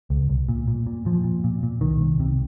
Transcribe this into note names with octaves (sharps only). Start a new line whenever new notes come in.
C#2
C2
A#2
A#2
A#2
A#2 F3
A#2
A#2
A#2
C2 D#3
C2
C3